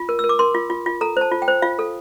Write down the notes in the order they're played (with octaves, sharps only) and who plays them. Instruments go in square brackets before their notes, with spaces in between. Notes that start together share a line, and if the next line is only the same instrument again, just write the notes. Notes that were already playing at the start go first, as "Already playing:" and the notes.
Already playing: [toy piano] F4
A#4
A#4 E6
D6
A#4 C6
F4
F4
F4
A4 A#5
C5 A5
F4
G5
C5
F4 F5
A4